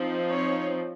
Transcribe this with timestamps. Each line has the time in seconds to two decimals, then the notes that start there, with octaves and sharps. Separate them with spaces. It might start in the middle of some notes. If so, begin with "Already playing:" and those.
Already playing: F3 C4 D#4
0.28 C#5